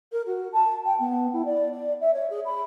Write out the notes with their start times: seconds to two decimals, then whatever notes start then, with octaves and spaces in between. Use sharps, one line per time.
0.12 A#4
0.26 F#4
0.52 A5
0.85 G5
0.99 B3
1.33 E4
1.45 D5
1.72 D5
2.01 E5
2.14 C#5
2.30 G#4
2.45 B5